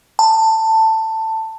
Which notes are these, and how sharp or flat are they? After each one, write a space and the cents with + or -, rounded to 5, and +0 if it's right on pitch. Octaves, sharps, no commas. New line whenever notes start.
A5 +15